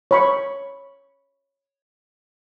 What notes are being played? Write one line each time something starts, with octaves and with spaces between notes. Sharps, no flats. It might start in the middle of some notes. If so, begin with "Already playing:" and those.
C#5 B5 C#6